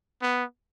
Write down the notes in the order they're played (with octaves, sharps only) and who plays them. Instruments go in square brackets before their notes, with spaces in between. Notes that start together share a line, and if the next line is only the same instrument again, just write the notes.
[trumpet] B3